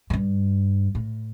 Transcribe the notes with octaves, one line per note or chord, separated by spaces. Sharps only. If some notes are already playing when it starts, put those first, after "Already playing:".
A2
G2
A2